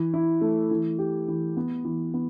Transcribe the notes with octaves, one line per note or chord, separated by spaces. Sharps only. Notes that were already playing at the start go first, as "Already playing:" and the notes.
Already playing: E3
E4
A3
E3
G4
E3
B3
E3
B3